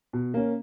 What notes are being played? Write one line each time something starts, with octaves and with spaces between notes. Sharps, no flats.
B2
A#3 C#4